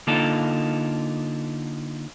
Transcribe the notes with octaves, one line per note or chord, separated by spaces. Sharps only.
D3 A#3 D#4 F4 A4